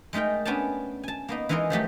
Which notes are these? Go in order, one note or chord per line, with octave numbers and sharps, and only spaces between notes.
G#3 A3 D#4 A#4 G5
B3 C#4 D4 C#5 G5 A5
G#5 A5
A#3 B3 D#4
E3 G#3 D#4 G#4 A#4 D#5
F3 F#3 A3 G4